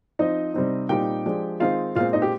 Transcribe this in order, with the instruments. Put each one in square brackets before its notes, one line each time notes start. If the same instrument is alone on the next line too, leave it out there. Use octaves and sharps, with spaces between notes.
[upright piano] F3 C4 D#4 D#5
C3 G3 C4 D#4
A#2 G3 C4 D#4 G4 G5
F3 G#3 D4
D#3 G#3 C4 D#4 F4 F5
A#2 G#3 C4 F4 F5
D#4 D#5
G4